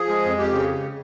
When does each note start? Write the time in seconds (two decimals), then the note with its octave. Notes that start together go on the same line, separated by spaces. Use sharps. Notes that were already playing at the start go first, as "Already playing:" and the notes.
Already playing: F3 G#4
0.09 G#3
0.23 F2
0.38 F2 G4
0.52 C#3